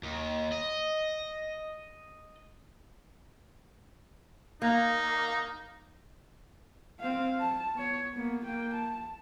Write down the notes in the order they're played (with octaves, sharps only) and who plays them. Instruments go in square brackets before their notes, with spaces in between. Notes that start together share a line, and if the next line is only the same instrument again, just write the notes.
[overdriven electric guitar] D#2
D#5
[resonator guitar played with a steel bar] A#3 [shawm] D#4
[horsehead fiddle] C4 F5
A5
B3 C#5
A#3 B3
A#3 G5
A5